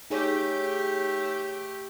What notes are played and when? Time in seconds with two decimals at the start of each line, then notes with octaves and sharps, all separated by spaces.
0.10 A3 D#4 G4 G#4 C#5